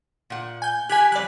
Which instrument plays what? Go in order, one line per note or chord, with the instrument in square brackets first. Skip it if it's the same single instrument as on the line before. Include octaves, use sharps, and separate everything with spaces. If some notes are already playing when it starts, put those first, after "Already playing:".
[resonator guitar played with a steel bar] A#2 F#5
[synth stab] G#5 G6
[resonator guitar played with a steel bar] G4 G#5 [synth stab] F#6 G#6 B6
[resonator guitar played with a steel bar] F2 G3 [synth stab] D5 F#6